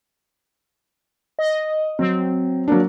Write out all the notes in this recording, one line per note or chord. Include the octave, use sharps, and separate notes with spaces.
D#5
F#3 C4
F#3 A#3 D4